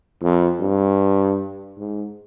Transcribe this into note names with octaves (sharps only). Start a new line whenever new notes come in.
F2
G2
G#2